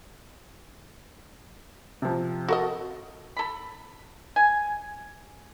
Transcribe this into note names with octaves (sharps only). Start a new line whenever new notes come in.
C3 F3
F#4 A4 A#4 D#5
A4 B5
G#5